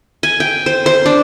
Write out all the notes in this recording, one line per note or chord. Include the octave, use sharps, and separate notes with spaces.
G#5
G5
C5
C5
D4